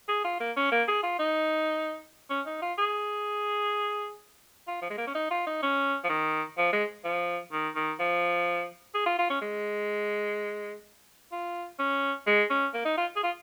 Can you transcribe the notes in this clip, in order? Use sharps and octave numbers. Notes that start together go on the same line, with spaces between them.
G#4
F4
A#3
C#4
A#3
G#4
F4
D#4
C#4
D#4
F4
G#4
F4
F3
G#3
A#3
C#4
D#4
F4
D#4
C#4
F3
D#3
F3
G#3
F3
D#3
D#3
F3
G#4
F4
F4
C#4
G#3
F4
C#4
G#3
C#4
A#3
D#4
F4
G#4
F4